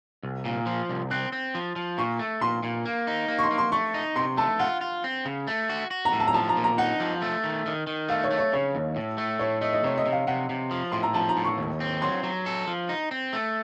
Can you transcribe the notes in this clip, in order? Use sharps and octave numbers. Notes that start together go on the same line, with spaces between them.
C2
A#2
F3
C2
C4 F#6
C4
F3
F3
A#2 C#6
A3
A#2 C6
A#2
A#3
D#4
A#3
C#6
C6
A#3
C6
A3 C#6
D#4
C3 C6
A3 A5
F4 F#5
F4
C4
C#3
A3
F#4
F#4
A#5
A2
A5
A#5
F3 A5
A#5
A#2
A#5
D#4 F#5
F3
A3
D#3
D#3
D#3
A3 F5
C#5
A3
C#5
C#3 C#5
D#2
A2
A3
A2 C#5
A3 D#5
D#5
C3 C#5
D#5
C3
F5
C3 F#5
C3
F3
A2 C6
A#5
F3 A5
A#5
A2
C#6
D#2
C4
F#3 C6
F#3
A4
F3
D#4
C4
A3